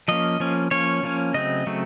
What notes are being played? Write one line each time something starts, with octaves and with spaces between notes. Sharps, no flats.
F3 A#3 C#4 D#5
F3 A#3 C#4
F3 A#3 C#4 C#5
F3 A#3 C#4
C#3 F#3 A3 C4 D#5
C#3 F#3 A3 C4